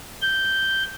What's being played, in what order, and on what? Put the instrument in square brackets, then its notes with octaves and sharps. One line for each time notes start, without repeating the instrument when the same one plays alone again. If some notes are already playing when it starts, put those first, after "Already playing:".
[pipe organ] G6